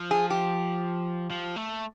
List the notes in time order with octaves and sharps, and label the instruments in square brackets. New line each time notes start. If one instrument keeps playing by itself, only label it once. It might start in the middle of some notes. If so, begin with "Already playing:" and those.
Already playing: [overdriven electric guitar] F3
[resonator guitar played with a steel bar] G#4
G4
[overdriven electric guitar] F3
A3